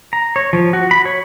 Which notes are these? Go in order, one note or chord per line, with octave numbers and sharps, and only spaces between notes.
A#5
C#5
F3
F#4
B5
C#5